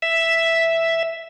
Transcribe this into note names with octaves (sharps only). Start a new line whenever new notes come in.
E5